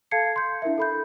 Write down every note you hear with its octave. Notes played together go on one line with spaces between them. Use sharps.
A4 F5 A5 G#6 C7 C#7
C6 G6
D4 E4 A#4 E5
A4 B5 G6